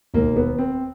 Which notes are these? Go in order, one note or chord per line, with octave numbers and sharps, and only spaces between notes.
E1 D#2 D#3 A#3
B3
C4